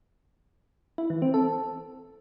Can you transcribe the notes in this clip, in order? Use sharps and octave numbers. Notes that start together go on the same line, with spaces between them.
E4
E3
C4
A4